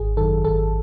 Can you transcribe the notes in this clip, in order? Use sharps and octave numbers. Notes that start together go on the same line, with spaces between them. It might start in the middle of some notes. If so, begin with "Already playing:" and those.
Already playing: G#1 G#4
F#2 D#3 A4
G#1 A4